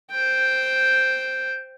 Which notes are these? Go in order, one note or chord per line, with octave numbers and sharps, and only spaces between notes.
C5 G5